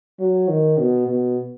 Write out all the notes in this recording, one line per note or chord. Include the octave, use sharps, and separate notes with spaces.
F#3
D#3
B2
B2